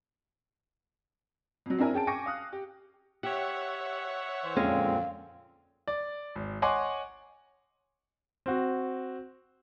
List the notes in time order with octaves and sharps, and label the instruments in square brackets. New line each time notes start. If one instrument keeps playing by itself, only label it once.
[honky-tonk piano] F2 F#3
C4 D4 E4 A#4 G#5
C#4 G#4 G5 A5 D7
G5 G#5 C#6 D6 A#6 C#7
F5 D#6 F#6
G4
[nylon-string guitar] G4 [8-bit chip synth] C#5 E5 F#5
[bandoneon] E3 C5
[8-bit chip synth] F2 [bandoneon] A#2 D3 C4 [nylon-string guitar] G#3 C#4 [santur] F5
[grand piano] D5
G#1
C#5 D#5 F#5 G#5 C6 D6
C4 F#4